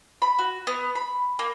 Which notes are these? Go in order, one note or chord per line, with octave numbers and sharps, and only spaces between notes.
B5
F#4
B3
B5
A#3